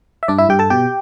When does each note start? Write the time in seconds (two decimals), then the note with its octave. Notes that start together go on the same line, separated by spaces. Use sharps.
0.23 E5
0.28 G2 D4 D5
0.38 E4 E5
0.49 G2 G4 G5
0.59 A4 A5
0.70 B2 G4 G5